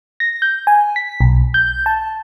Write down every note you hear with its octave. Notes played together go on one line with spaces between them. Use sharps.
A#6
G6
G#5
B6
B1
G6
A5